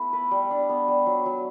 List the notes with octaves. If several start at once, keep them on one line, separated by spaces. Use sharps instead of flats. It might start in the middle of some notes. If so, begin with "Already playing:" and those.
Already playing: A3 B3 E4
B4
G3
D4
B3
G3
F#3
F#3